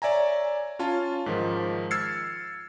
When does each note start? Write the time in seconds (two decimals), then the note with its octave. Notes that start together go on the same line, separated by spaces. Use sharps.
0.02 C#5 D5 E5 G#5 A#5
0.79 C#4 F4 F5 A5
1.26 G#2 D#3 F3
1.91 E6 F6 G#6 A6 C7 C#7